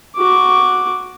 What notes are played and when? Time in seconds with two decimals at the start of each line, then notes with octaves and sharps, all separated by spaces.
0.17 F#4 D6